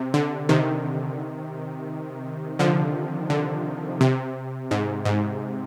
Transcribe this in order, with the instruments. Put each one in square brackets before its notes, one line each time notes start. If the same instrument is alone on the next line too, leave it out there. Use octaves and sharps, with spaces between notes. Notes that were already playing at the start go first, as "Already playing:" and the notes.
Already playing: [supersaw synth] C3
D3
C3 D#3
D3 F3
D3
C3
G#2
G#2